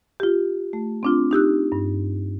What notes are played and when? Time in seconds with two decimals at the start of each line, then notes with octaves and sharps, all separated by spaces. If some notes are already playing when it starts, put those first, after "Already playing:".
0.20 F4 G4
0.73 A3
1.03 C4 D4 F4
1.31 D#4 G4 E6 F#6
1.72 G2